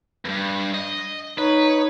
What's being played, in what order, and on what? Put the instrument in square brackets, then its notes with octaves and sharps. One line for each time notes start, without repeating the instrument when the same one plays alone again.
[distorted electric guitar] E2 G2
D#5
[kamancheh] D#4 C#5 [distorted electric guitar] B4